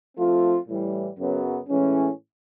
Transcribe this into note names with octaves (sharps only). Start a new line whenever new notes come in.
F3 A3 C4 F4
A2 E3 G3
F#2 C#3 F#3 B3
A2 E3 G#3 C#4